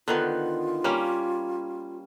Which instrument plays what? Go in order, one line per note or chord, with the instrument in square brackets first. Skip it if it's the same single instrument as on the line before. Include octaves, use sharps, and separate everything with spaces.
[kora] D3 D#3 B3 [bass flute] F4
[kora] G3 A#3 C#4